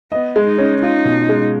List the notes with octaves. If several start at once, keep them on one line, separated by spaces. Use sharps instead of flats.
B3 D#5
G#3
D#4
C#4
D#4 F4
B2
G#3